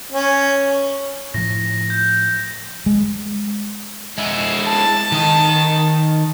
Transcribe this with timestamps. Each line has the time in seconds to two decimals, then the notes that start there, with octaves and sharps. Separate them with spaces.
0.13 C#4
1.34 A2 F3 A#6
1.90 G6
2.86 G#3
4.18 G#3 E4
4.67 A5
5.12 D#3 D#5